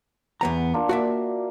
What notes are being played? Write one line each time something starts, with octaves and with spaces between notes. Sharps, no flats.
E2 B3 A#5
A#3 D4 F4
F#4 D5 E5